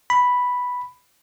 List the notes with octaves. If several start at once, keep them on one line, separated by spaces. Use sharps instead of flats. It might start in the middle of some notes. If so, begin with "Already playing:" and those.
B5